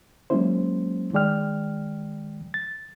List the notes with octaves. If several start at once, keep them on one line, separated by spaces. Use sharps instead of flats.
F#3 G#3 A#3 C#4 E4 C5
D#3 G#3 D5 G5 F6
A6